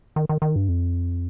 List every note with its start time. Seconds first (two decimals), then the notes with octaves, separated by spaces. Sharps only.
0.16 D#3
0.29 D#3
0.42 D#3
0.56 G2
0.69 F2